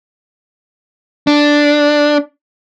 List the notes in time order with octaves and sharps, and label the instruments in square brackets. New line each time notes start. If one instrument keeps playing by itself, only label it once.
[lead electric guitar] D4